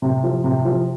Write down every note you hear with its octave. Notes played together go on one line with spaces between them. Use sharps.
C3
F3
C3
F3